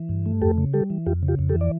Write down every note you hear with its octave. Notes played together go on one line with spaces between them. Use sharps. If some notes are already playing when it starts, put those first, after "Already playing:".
Already playing: E3
G2
A3
F2 G4 A4
C#3
G3 G4 A4
E3
F2 F4 G4
C#3
F4 G4
F2
G4 A4
E3
D5